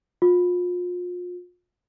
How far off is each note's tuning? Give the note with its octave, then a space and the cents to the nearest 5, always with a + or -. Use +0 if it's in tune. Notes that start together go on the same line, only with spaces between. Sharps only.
F4 +35